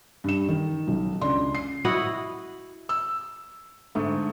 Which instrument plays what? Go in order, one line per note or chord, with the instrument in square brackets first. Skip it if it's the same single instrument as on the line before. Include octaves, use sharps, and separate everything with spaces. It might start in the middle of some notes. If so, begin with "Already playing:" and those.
[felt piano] G2 E7
D#3
B1
C#2 D4 C6
C7
[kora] E4 F#4 D#5 F#5
[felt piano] E6
G#2 D3 A3